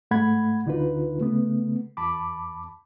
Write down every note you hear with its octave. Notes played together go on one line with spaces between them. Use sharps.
G#2 A3 F#5 B5 G#6
D2 D3 D#4 F4 B4
C#3 A3 B3
E2 A5 B5 D6